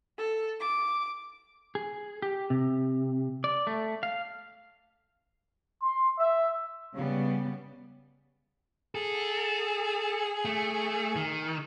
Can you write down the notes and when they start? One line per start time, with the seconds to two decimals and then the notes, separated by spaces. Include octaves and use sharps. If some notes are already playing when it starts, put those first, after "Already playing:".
0.18 A4
0.60 D6
1.75 G#4
2.22 G4
2.50 C3
3.44 D5
3.67 A3
4.03 F5
5.82 C6
6.19 E5
6.94 C#3 G3 B3
8.95 G#4 A4
10.45 A3
11.16 D#3